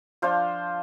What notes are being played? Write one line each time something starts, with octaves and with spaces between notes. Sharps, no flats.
F3 D4 F4 C5 F5